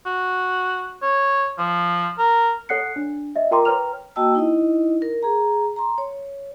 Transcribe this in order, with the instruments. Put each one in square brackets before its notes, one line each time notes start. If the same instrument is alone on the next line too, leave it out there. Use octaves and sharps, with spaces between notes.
[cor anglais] F#4
C#5
F3
A#4
[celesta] A4 C#5 F#5 F#6 C7 C#7
D4
D#5 E5
F4 A#4 G5 A#5 C6 D6
B4 C#5 G5 A#5 F6 F7
[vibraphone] A#3 F#4 D#5 G5 A5 E6
D#4 E4 D#5
A#4
G#4 A#5
A#5 C6
C#5